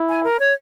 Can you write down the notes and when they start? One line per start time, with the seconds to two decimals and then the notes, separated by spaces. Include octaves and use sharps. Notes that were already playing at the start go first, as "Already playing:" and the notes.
Already playing: E4
0.09 G#5
0.24 A#4
0.40 C#5